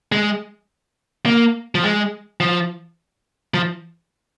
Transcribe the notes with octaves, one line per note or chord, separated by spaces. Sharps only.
G#3
A#3
F3
G#3
F3
F3